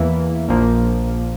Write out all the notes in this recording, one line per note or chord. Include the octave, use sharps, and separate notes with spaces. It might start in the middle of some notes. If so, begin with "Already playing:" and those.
Already playing: E2 E3 A#3 E4
A#1 A#2 F3 A#3